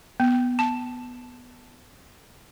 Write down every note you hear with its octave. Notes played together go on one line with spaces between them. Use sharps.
B3
A5